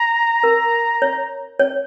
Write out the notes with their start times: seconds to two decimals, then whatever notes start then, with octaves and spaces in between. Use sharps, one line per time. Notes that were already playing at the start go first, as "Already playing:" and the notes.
Already playing: A#5
0.44 A#4
1.02 C#5
1.59 C#5